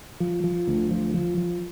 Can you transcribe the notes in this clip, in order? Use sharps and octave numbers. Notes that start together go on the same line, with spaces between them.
F3
F3
D2
F3
F3
F3